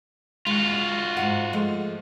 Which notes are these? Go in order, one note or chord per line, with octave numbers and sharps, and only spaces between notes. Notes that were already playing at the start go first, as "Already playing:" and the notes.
G#3 F4 F#4
G#2 D#3 F#5
F3 G#3 A3